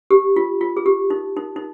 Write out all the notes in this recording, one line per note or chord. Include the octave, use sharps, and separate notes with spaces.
G4
F4
F4
G#4
G4
D#4
D#4
D#4